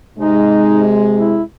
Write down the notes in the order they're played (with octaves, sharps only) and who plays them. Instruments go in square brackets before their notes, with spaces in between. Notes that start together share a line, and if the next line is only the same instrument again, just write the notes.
[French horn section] C3 G#3 [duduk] D#4
[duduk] E4